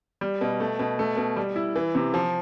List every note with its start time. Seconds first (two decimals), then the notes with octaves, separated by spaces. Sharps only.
0.21 G3
0.41 B2
0.60 A3
0.79 B2
0.99 A3
1.17 B2
1.36 G3
1.56 E4
1.76 E3
1.95 C3
2.14 F3